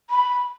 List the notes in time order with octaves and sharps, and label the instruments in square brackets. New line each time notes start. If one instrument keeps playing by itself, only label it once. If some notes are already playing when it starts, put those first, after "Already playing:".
[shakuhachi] B5